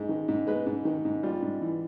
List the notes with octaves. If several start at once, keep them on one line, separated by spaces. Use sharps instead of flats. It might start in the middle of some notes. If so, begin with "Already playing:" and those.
Already playing: G#2 G#3
D#3
G#2
G#3 B4
G#2
D#3
G#2
G3 F4
G#2
E3